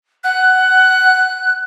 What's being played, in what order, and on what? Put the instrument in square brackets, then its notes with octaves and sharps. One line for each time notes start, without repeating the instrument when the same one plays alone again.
[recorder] F#5 [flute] F#6